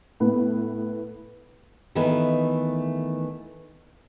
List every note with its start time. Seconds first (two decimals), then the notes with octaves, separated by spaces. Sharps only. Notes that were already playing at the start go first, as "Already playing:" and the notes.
0.20 A2 B3 B4
1.95 D#3 E3 A3 B3 B4